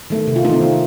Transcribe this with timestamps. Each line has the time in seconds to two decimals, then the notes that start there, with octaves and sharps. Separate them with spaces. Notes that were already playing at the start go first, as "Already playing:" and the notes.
0.10 D#3 A3
0.27 C3
0.36 F4
0.45 D#3 A3 D#4
0.54 C4
0.63 D#3